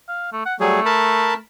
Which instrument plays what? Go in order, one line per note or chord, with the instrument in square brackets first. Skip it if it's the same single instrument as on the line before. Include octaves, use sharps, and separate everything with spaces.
[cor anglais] F5
A3
F#5
[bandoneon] F#3 G3 G#4 [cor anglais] A3
[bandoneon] A#4 A5 B5